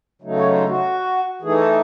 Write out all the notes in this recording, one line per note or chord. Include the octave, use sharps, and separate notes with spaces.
C#3 F#3 A3 D#4
C#5
C5
F#4
E3 A3 D#4 G#4
A4